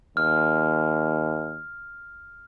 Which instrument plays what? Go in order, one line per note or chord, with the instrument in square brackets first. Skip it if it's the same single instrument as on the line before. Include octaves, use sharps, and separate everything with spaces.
[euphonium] D#2 [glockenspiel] F6